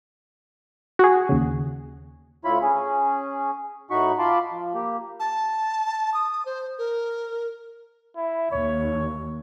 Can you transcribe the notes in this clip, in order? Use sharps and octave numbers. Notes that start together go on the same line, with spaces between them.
F#4 G#4
D#2 C#3
D2 E4 F4 C#5 B5
C#4 G#4
A2 D#4 F#4 B5 C#6
F4 A5 B5 C6 D6
F3
A#3 G4
A5
D#6
C5
A#4
E4
D#2 C#5